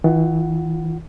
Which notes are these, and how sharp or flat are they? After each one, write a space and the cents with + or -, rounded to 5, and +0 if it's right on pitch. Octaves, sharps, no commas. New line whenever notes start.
E3 -35 F4 +0 F#5 +15